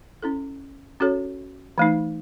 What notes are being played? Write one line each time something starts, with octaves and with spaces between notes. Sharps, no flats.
C#4 E4 A4
C#4 F#4 A4 C#5
E3 A3 D#4